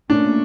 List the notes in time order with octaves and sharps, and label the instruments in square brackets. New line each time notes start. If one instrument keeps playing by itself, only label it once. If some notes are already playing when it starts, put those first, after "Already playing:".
[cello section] A#2 A3 C#4 [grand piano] D4